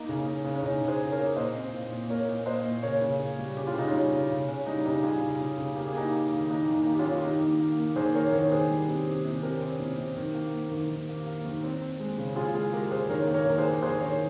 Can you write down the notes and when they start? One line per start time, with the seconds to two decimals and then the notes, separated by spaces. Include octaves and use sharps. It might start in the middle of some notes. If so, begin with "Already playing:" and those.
Already playing: A#3 D#4
0.09 C#3
0.26 C#3
0.44 C#3
0.55 C#4
0.63 C#3 D#4
0.81 C#3
0.88 G#4 C5
1.00 C#3
1.12 A#4 C#5
1.18 A#3
1.36 A#2 C5 D#5
1.56 C4
1.74 A#2
1.92 A#2
2.10 A#2 A#4 C#5
2.28 A#2
2.46 A#2 C5 D#5
2.65 A#2
2.83 C#3 A#4 C#5
3.02 C#3
3.20 C#3
3.39 G3
3.57 C#3 G4
3.67 F4
3.74 C#3 D#4
3.87 C#4 F4
3.93 G3
4.12 C#3
4.30 C#3
4.48 C#3 C#4
4.66 G3 D#4
4.84 C#3 D#4 G4
5.03 G3 F4 G#4
5.21 C#3
5.40 C#3
5.58 C#3
5.76 A#3 G4
5.87 G#4
5.95 A#3 D#4 G4
6.13 A#3
6.32 D#3
6.49 A#3 D#4
6.69 D#3
6.74 D#4
6.87 A#3 G4
6.99 C#4 F4
7.05 D#3
7.15 F4
7.23 A#3 D#4 G4
7.41 D#3
7.60 A#3
7.79 A#3
7.96 D#3 G#4 C5
8.15 A#3 A#4 C#5
8.33 D#3 A#4 C#5
8.52 D#3 G#4 C5
8.70 G3
8.88 C3
9.06 C3
9.25 C3
9.42 C3 G4 A#4
9.62 C4
9.80 C3
9.98 C3
10.17 D#3
10.35 A#3
10.54 A#3
10.71 D#3
10.90 D#3
11.09 A#3
11.27 A#3
11.45 D#3
11.64 C4
11.81 C4
12.00 G#3
12.18 C#3
12.36 C#3 F4 G#4
12.54 G#3 F4 G#4
12.73 G#3 G4 A#4
12.91 C#3 G#4 C5
13.09 D#3 A#4 C#5
13.27 A#3
13.34 A#4 C#5
13.47 D#3 A#4
13.58 G#4 C5
13.64 A#3
13.82 D#3 G#4 C5
14.01 D#3 A#4 C#5